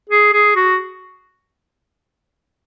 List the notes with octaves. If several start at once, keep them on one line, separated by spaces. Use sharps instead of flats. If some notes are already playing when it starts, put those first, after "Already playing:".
G#4
G#4
F#4